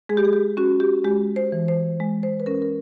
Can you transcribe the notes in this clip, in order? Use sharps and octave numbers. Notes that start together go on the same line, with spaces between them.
G#3 G#4
G4
G#4
G4
C#4 F#4
G4
G#3 G4
C5
E3
C5
G#3
C5
B4
C#4 A#4
A#4